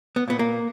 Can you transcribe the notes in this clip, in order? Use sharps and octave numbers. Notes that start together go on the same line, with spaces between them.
B3
A#2 B3
A#3